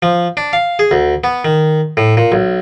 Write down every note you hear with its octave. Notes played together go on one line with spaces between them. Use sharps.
F3
D4
F5
G#4
D2
B3
D#3
A2
A#2
B1